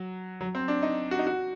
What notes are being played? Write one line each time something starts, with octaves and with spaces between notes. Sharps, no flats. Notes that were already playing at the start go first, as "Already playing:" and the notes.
Already playing: F#3
F#3
C4
D4
D#4
F#4
D#4
F#4